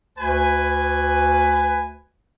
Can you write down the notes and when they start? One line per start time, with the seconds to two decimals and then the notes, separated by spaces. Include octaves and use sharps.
0.18 D2 B4 G#5